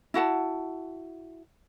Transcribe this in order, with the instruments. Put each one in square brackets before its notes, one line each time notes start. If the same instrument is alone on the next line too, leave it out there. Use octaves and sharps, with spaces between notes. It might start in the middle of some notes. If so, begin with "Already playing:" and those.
[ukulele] E4 F#4 F#5 A5